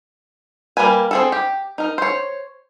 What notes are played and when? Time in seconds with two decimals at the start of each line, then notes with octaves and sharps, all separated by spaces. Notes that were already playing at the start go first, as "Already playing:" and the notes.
0.77 G3 A#3 A#4 B4 G#5
1.11 C4 G#4 A4
1.32 G4
1.78 D#4 A#4
1.98 C5 C#5